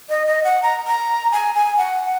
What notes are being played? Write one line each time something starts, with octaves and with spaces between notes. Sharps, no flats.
D#5
D#5
F#5
A#5
A#5
G#5
G#5
F#5